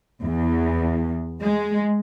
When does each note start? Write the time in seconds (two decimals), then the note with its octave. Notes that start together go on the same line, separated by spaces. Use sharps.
0.25 E2
1.42 G#3